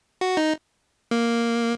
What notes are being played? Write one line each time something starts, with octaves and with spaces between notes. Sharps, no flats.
F#4
D#4
A#3